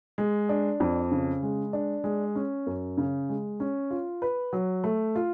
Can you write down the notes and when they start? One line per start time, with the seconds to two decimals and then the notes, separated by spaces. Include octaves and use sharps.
0.18 G#3
0.49 D4
0.80 F2
1.11 C#3
1.43 G#3
1.73 D4
2.04 G#3
2.35 C#4
2.67 F#2
2.97 C#3
3.29 G#3
3.60 C#4
3.91 F4
4.22 B4
4.53 F#3
4.84 A3
5.16 F4